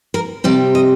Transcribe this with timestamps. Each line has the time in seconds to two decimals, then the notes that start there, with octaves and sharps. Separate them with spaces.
0.14 A#4
0.44 C3 G3 C4 D5
0.75 D#5